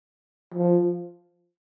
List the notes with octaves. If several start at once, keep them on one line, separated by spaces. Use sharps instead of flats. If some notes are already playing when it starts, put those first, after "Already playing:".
F3